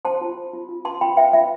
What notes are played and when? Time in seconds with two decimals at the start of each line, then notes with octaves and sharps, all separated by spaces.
0.05 C5 A5 C6
0.21 F4
0.37 C5
0.53 F4
0.69 F4
0.85 B4 A5 C6
1.01 F4 G5 B5
1.17 B4 E5 G5
1.33 F4 E5